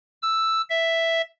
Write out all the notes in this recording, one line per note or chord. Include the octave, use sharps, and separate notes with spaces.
E6
E5